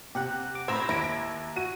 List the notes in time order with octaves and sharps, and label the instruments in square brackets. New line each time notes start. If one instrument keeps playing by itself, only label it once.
[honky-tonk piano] C3 F#6 [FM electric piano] G4 F#5
[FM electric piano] D6
[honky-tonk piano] A2 B5 [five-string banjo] C4 [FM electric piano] A#5 E6 G#6
[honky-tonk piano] D#2 A#6 D7 [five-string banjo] E4
[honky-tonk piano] F#4 D#7